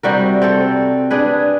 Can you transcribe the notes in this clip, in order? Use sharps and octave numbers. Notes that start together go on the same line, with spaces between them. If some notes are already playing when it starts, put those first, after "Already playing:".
C3 G3 F#4 A#4
C4 A4
D4 G#4 B4